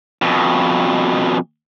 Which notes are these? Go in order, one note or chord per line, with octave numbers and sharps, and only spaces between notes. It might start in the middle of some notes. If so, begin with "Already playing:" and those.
F2 B2